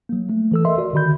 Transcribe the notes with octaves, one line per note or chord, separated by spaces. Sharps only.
F#3 A#3
A3
E3 A4 E6
A#4 D#5 E5 C6
F#4 A#4 D5
D3 D#3 F#4 B5 G6